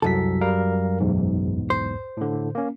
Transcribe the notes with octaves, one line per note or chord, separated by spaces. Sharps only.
C2 F#2 A4 B6
G3 A#4 F5
B1 E2 G#2
C5
A2 D3
A#3 C#4